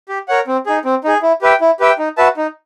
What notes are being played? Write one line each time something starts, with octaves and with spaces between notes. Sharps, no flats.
G4
A#4 C#5 F#5
C4
D#4 G#4
C4
D#4 G#4
E4
G4 B4 E5 G5
E4
G4 B4 E5 G5
D#4
F#4 B4 E5 A5
D#4